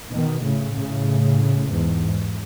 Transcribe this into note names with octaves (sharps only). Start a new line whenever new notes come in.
B2 D#3
A2 C#3
A2 C#3
E2 G#2